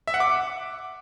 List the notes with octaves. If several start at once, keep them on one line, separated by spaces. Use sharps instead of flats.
E5
F#5
D6